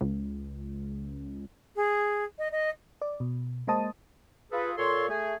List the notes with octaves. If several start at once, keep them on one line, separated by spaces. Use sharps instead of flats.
C#2
G#4
D#5
D#5
D5
B2
G#3 A#3 C5 D#5 A5 D#6
F4 G#4 A4 B4
A#2 A4 C#5 C6
A3 G#4